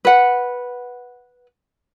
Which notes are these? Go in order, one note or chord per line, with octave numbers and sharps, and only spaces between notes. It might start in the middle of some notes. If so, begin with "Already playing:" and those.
B4 F#5